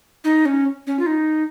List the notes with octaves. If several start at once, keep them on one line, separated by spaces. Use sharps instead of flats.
D#4
C#4
C#4
F4
D#4